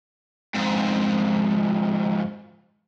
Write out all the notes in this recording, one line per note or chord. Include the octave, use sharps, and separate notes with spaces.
F2 G#2